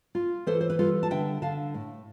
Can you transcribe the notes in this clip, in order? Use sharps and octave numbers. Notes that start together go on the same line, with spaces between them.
F4
E3 A4 C5
C5
B4
G3 F4 A4
A5
D3 E5 G5
D3 F5 A5
A2